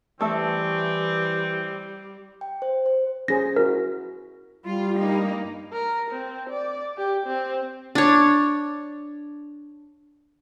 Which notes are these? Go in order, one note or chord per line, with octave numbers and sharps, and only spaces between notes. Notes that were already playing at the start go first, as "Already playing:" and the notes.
E3 G3 A3 C4 A4 E5
G5
C5
C5
C#4 G#4 C5 A#6
E4 F#4 A#4
G3 F4
G2 A#3 D#4
A#4
C4
D5
G4
C4
D4 C#5